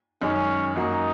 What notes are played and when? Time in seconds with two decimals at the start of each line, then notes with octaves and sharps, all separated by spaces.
0.22 F#2 D#3 G#3 C#4
0.75 F#2 F#3 A#3 D#4 F#4